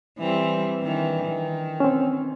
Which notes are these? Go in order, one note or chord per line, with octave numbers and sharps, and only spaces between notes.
E3 G3 C4
D#3 E3 D4
D#3
C4 C#4